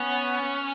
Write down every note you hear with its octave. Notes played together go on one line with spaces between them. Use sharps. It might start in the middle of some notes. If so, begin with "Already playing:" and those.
Already playing: B3 C#4